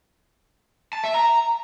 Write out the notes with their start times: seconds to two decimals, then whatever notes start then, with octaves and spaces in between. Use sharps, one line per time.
0.93 A5
1.04 E5
1.14 A#5